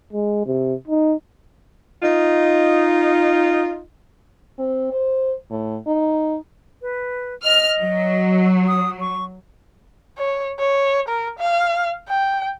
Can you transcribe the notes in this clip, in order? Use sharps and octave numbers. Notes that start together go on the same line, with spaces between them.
G#3
C3
D#4
D#4 F4
C4
C5
A2
D#4
B4
D#5 F6
F#3
D#6
C#6
C#5
C#5
A#4
F5
G5